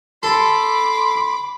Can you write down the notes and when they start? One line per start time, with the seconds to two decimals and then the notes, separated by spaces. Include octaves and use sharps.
0.23 A4 B5 C6 D6